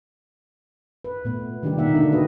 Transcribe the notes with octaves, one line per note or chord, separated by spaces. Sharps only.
B4
A#2 A3 B3
C3 D#3 G3 D4 D#4 G4
B2 A#3 D#4 E5 F#5
D3 A3 A#3 D4
A#3 D#4 F#4 G4 B4 D#5